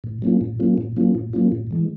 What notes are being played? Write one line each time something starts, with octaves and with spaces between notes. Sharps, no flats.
A2
F#3 A#3 C#4 F4
A2
F#3 A#3 C#4 F4
A2
F#3 A#3 C#4 F4
A2
F#3 A#3 C#4 F4
A2
E3 G#3